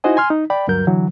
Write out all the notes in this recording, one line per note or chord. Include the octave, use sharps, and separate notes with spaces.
D#4 E4 F#4 C5 D#5 G#5
G#5 C6 F6
D#4
D5 G5 B5
D2 G2 F#3 A#4 G6
D3 E3 F#3